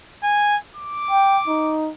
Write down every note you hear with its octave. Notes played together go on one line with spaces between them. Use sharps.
G#5
D6
G5
D#4